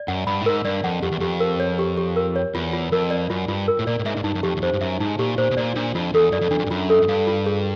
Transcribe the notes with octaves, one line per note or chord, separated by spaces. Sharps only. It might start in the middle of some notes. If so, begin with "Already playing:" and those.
Already playing: D5
F#2 F#5
G2 B5
A2
G#2 A#4
G2 D5
F2 F#5
F2 G4
E2
F2 G4
A#4
C#5
G4
G4
A#4
C#5
E2 F4
F4
F2 A#4
D5
F#2 F4
G2 F4
A#4
A2
A#2 D5
A2
G#2 E5
G#2
G2 D#4
F#2
F2 G4
E2
F2 C5
G2
F#2 E5
G#2 D#4
A#2 G4
A#2 C5
B2
A#2 D5
A#2 D4
F2 F4
E2 A4
F#2 D5
F2
E2 D4
F2
G2
F#2 F4
A4
F#2
G2 F5
F4
G#4